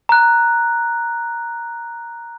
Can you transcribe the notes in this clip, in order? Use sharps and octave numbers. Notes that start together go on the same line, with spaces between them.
A#5 F#6